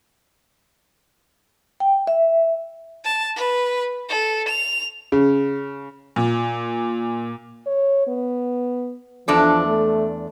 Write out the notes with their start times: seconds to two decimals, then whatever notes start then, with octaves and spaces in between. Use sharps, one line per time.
1.80 G5
2.07 E5
3.04 A5
3.36 B4
4.09 A4
4.48 F7
5.12 C#3
6.16 A#2
7.66 C#5
8.08 B3
9.28 E2 F3 D4 A4
9.66 A3